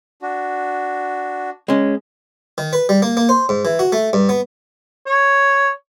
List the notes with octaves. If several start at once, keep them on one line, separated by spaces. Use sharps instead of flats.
D4 F#4
G#3 C#4
D#3
B4
G3
A#3
A#3
C5
G#2
E3
F#4
A3
G2
B3
C#5